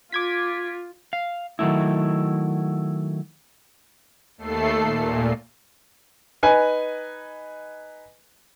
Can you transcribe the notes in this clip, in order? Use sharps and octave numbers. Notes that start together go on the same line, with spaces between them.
F4 D6 G#6 B6
F5
D#3 F#3 A3 E4
D#2 A3 A4 C7
A#2
D#4 B4 G#5